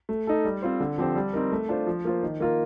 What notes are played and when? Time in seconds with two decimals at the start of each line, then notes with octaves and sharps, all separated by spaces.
0.09 A3
0.27 D#4 A4
0.45 G3
0.62 C4 F4 C5
0.80 D3
0.98 F3 C4 G4 C5
1.16 G3
1.33 C4 D#4 A#4
1.52 A3
1.69 D4 F4 C5
1.87 F3
2.05 A#3 F4 C5
2.23 D#3
2.40 A#3 F4 A#4